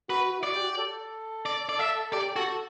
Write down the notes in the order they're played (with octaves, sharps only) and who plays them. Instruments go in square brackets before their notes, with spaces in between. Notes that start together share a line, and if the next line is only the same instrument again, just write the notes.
[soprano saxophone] F#4 [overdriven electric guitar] B4
[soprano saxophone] F#4
E4
[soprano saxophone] F#4 [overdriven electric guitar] D5
[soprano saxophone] G4
F#4
G4
A4
[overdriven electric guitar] D5
D5
E5
[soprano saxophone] G4 [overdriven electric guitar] D5
[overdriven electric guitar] F#4 [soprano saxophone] A4